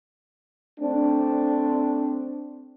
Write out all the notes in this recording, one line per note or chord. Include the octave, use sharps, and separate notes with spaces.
A3 C4 D4